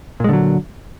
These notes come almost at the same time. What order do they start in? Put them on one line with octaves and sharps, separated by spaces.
A#2 G#3 D3 F#3